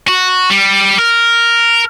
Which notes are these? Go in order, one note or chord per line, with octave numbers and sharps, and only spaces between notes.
F#4
G3
A#4